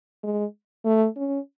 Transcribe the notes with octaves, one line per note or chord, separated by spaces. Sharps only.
G#3
A3
C#4